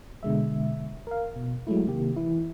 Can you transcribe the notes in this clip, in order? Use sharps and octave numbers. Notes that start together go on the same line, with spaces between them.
B2 D3 G#3 E5
A#4 F5
B2
F#3 G#3 A3 E4
C3 D#3 A#3 G4
E3 E4